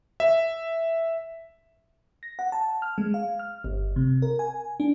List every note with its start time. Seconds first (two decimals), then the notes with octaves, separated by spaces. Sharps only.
0.20 E5
2.23 A#6
2.39 F#5
2.52 A5
2.82 F6
2.98 G#3
3.14 F5
3.39 F6
3.64 G1
3.96 C3
4.22 A#4
4.39 G#5
4.80 D4